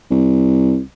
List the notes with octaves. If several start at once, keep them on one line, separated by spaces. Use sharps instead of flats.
C2